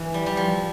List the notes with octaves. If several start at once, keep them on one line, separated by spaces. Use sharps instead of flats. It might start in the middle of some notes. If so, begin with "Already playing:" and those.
Already playing: E3
G3
G3
F3